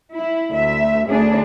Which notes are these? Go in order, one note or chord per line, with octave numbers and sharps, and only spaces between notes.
E4
D2 E5
D2 D4 G#4